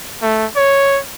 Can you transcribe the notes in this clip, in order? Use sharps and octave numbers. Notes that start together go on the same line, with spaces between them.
A3
C#5